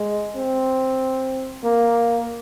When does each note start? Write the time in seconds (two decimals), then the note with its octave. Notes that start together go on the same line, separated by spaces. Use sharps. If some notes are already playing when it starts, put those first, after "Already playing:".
Already playing: G#3
0.37 C4
1.64 A#3